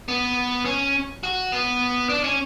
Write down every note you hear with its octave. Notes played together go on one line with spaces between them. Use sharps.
B3
C#4
F#4
B3
D4
C#4